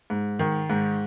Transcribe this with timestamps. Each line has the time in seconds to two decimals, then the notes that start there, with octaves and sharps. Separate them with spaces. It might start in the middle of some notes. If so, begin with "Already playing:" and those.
0.10 G#2
0.39 D#3
0.70 G#2